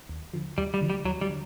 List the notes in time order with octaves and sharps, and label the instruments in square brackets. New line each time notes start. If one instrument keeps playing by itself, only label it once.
[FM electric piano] D#2
D3 F3
[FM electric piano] D#2 [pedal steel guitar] G3
[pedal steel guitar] G3
[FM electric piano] D3 F3
[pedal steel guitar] G3
[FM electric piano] D#2 [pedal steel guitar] F#3
[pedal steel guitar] G3
[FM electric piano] D3